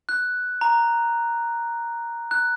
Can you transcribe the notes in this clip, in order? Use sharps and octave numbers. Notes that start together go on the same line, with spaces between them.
F#6
A#5
F#6